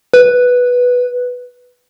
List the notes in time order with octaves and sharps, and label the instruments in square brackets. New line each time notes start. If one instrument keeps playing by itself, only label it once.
[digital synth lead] B4